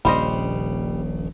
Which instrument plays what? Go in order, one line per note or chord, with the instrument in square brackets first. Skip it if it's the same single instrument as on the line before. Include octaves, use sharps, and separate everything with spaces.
[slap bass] D#1 A#1 C#3 [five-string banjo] G3 C5 D#5